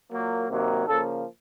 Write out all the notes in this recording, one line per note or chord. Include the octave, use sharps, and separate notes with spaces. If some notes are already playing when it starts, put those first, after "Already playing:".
A#2 F#3 A#3
C3 D#3 F#3 A#3
C#3 F3 A#3 A4